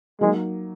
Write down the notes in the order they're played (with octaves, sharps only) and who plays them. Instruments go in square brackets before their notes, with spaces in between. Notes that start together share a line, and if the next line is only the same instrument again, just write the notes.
[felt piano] F#3 A#3 D#4 [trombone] G#3